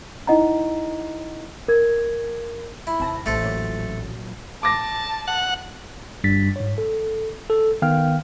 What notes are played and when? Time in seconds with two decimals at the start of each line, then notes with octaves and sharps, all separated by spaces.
0.27 D#4 E4 D#5 F#5 A#5
1.68 A#4 G#6
2.87 E4
3.00 D#2 C3 C4 A5 A#6
3.26 A1 A3 A4 C5
3.44 A#2 F#3
4.63 A5 D6 A#6
5.28 F#5
6.24 G1 G2 G3 D4 A6 B6
6.56 G#2 C#5
6.78 A4
7.50 A4
7.82 D#3 B3 F5 G5 F6